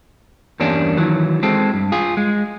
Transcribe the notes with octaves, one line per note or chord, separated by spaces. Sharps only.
E2 G2 G3 A#3 C#4 D4
D#3 E3 F#3
G#3 C4 A4
G2
F4 G#4
G#3